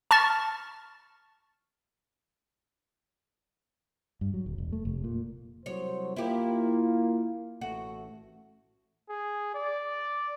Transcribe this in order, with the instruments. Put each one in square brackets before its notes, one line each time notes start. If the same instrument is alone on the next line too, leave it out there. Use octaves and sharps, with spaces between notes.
[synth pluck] A5 C#6 F6 A6
[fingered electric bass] G2
F#3
D1
E1
A3
F1
A#2
[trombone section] C2 F#3 C5 [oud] C#5
[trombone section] A#3 F4 [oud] E4 G4
[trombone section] A1 A3 [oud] F#4
[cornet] G#4
D5